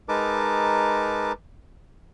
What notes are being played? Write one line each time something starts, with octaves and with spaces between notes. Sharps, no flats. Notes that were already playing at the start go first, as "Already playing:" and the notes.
G#3 D#4 A#4 B4 A5 D6